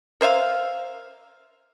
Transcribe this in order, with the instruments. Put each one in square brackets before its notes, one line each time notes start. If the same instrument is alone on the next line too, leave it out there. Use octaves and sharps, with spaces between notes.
[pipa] A#4 C5 E5 F5